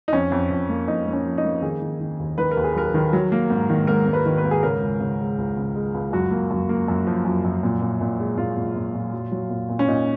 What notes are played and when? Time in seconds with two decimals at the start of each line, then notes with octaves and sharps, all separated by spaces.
0.08 D#4
0.13 F2 C#4
0.32 F2
0.50 F2
0.69 A#3
0.88 F2 D#4
1.07 A#3
1.13 C#4
1.26 F3
1.38 D#4
1.45 A#3
1.62 D#3 G#4
1.82 D#3
2.00 D#3
2.19 D#2
2.38 D#3 B4
2.51 A#4
2.57 D#2
2.64 G#4
2.75 F#3 A#4
2.94 D#3
3.13 F#3
3.32 A#3
3.50 G#2
3.70 D#3
3.87 G#2 A#4
4.07 G#2
4.13 B4
4.26 D#3
4.38 B4
4.44 G#2
4.51 G#4
4.63 C#3 A#4
4.81 C#2
5.00 C#3
5.19 G#3
5.38 C#2
5.57 C#2
5.76 G#3
5.94 C#2
6.13 F#2 F#4
6.31 A#3
6.51 F#2
6.69 A#3
6.88 F#2
7.07 F3
7.25 F#2
7.45 F#2
7.63 A#2
7.81 A#2
8.01 A#2
8.19 G#3
8.38 A#2 F4
8.57 A#2
8.75 A#2
8.94 A#2
9.13 F#3
9.32 F#3
9.50 A#2
9.69 A#2
9.79 C#4
9.88 A#2 D#4